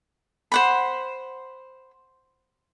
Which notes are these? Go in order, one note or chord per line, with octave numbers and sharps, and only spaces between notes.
C5 F#5 B5